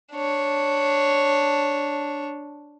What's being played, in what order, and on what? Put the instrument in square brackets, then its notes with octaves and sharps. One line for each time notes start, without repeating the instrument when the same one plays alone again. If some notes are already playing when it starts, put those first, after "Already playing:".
[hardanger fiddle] D4 C#5